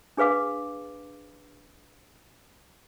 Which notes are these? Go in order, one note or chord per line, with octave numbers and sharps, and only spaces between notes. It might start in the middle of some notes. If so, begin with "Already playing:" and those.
D4 G#4 B4 F5 D6